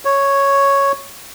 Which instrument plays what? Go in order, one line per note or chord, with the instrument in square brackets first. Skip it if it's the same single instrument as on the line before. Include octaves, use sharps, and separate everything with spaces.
[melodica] C#5